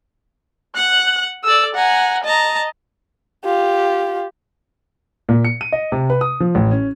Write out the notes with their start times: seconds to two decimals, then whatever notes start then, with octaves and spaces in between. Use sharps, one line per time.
0.76 F#5 F#6
1.44 A4 D5 E6
1.75 F#5 G#5 A#5
2.24 D#5 A5 A#5
3.44 F4 G4
5.29 A#2
5.45 C#7
5.61 D#7
5.72 D#5
5.92 C3
6.10 B4
6.21 D#6
6.40 F3
6.55 A1
6.71 C#4